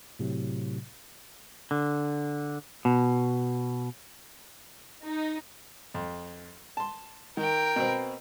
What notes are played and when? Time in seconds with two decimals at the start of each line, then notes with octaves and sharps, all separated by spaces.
0.19 A2 C3 F#3
1.71 D3
2.85 B2
5.04 D#4
5.94 F2
6.77 A5 C6
7.37 D#3 A#4 G5
7.76 B2 B3 C4